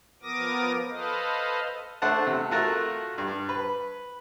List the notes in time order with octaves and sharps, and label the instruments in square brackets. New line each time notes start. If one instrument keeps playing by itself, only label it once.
[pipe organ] F3 B3 A#4 D6 D#6 A#6
A4 B4 C5 D#5 F5
[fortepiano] A3 D4 C5 F#5 A5
C3
A3 F4 F#4 A#4 A5
G2
B4